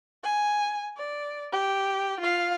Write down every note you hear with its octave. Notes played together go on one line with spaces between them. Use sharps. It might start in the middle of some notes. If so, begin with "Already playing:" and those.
G#5
D5
G4
F4 F5